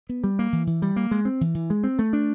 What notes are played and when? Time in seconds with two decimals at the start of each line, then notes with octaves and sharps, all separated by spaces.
0.09 B3
0.24 G3
0.39 A#3
0.53 E3
0.67 E3
0.82 G3
0.96 A#3
1.11 G#3
1.25 C4
1.41 E3
1.55 E3
1.70 G#3
1.84 C4
1.99 A3
2.13 D4